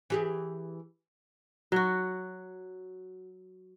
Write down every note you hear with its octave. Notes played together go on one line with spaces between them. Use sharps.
E3 G4 G#4
F#3 F#4